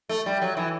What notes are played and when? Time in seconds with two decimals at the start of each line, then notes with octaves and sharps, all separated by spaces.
0.09 A3
0.26 G3
0.42 F#3
0.57 E3